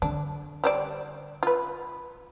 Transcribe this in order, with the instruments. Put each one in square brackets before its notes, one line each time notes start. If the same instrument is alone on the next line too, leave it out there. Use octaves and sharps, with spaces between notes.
[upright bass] D3 [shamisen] D4
[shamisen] G3 C5 D5
F4 B4